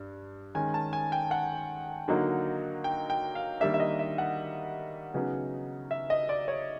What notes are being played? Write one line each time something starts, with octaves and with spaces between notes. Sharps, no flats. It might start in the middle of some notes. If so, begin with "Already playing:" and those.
Already playing: G2
D#3 G#3 C#4 G#5
A5
G#5
G5
F#5
D3 F#3 A#3 D#4
G5
G5
F5
D#3 G3 A#3 D4 E5
E5
D#5
E5
F#5
C#3 F#3 B3 D#4
E5
D#5
D5
C#5